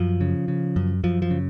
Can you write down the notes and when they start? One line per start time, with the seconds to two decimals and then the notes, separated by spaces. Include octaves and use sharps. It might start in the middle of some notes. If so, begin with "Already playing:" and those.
Already playing: F#2 F3
0.21 C#3
0.48 C#3
0.76 F#2
1.04 F#2 F3
1.22 F3
1.30 C#3